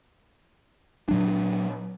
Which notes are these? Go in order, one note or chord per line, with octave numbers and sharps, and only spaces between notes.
A#2 F#3 D4